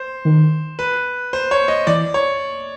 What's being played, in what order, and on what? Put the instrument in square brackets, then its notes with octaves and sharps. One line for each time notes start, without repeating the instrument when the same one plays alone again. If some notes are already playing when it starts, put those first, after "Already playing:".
Already playing: [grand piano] C5
[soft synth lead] D#3
[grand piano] B4
C5
C#5
D#5
[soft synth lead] E3 [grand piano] D5
[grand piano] C#5